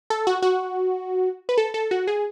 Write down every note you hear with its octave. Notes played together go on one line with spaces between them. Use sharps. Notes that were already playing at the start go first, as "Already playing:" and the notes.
A4
F#4
F#4
B4
A4
A4
F#4
G#4